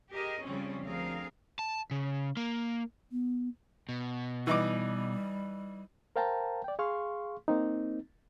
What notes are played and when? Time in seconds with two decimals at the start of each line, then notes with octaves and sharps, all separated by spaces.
0.12 G4 G#4 A#4 D#5
0.43 C#3 F3 G3 C4 C#4
0.82 D2 F3 C4 G#4 A#4 F5
1.59 A5
1.91 C#3
2.37 A#3
3.12 B3
3.89 B2
4.47 E3 G3 D#4 D6
6.16 A#4 C5 F5 G5 A5 A#5
6.64 D5 G5
6.79 G#4 F5 C6 C#6 F6
7.48 A#3 C4 D#4